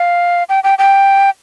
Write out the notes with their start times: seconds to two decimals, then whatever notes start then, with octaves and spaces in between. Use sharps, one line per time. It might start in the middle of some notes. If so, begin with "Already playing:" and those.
Already playing: F5
0.49 G5
0.64 G5
0.78 G5